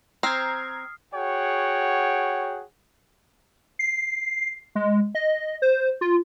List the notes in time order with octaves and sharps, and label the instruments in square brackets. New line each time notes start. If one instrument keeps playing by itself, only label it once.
[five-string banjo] C4 [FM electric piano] A#5 G#6 [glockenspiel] D#6 F6 C7
[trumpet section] F#4 G#4 C#5 F#5 G5
[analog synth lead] C7
G#3
D#5
C5
F4